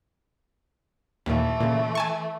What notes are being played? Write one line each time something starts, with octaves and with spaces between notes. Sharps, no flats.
D#2 A#2 E3 A3
A#2 C#3
G#5 A5 C#6